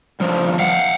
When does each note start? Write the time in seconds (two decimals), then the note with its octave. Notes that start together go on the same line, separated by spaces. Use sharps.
0.20 G2 F3
0.59 F5 F#5